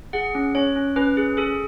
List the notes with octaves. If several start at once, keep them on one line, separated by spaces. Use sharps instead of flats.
G#4 F#5
C#4
C#4 C#5
C#4
C#4 B4
G#4
G#4 A4